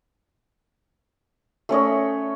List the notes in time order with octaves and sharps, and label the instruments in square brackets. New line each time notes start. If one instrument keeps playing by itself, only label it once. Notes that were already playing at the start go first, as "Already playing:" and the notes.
[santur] A3 C#4 C#5 D#5